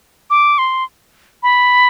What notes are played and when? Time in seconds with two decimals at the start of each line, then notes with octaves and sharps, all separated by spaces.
0.30 D6
0.58 C6
1.43 B5